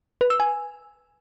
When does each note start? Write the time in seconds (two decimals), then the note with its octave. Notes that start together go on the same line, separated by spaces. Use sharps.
0.21 B4
0.30 E6
0.40 G#5